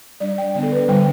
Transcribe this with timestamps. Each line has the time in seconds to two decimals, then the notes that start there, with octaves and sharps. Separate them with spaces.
0.20 G3 D4 D5
0.38 G5
0.54 D3 B3 D4 D5
0.63 A4
0.72 B4
0.88 D3 G3 D4 G5